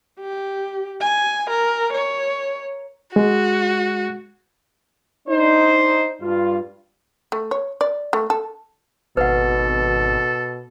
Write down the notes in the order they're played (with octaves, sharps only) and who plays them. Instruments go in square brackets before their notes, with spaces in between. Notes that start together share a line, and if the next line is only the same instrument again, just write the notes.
[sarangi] G4
G#5
A#4
C#5
[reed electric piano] G#3 [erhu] F#4
[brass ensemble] D4 D#4 C5
G2 F4
[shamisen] A3
C#5
D5
A3
A4
[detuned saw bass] G#1 [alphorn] B2 [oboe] A4 [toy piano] B4 F#5